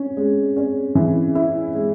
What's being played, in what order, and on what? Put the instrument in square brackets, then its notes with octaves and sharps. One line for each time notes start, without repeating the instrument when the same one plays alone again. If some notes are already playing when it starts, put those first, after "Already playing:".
Already playing: [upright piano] C#4
G#3
C#4
E3
E4
G#3